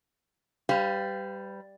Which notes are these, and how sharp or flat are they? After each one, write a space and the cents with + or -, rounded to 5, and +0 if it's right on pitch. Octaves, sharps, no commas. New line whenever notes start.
G3 +0 B4 +40 F5 -10